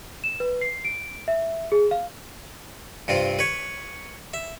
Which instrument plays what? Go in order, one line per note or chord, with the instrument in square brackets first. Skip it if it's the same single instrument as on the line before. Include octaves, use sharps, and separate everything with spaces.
[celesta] E7
B4
C7
D7
E5
G#4
F5
[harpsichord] G2 C3 C4 F4
B4 C#5
E5